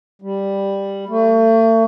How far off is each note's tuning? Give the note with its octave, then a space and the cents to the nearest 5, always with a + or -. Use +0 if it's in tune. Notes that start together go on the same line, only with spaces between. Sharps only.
G3 +5
A3 +40